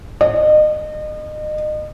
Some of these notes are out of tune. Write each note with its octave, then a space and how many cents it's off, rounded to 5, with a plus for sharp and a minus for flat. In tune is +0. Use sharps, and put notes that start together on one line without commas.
D#5 -35